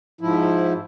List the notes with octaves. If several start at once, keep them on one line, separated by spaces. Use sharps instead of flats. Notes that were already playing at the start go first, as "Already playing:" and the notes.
G#2 F3 E4